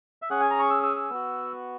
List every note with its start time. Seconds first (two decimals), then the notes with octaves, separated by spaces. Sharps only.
0.22 E5
0.30 C#4 G#4 F#5
0.40 G#5
0.50 A#5
0.59 C#6
0.70 E6
0.83 E6
0.96 E6
1.10 B3 F#4